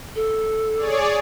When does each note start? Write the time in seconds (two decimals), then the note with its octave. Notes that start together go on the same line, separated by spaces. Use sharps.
0.15 A4
0.76 G#4 C#5 D5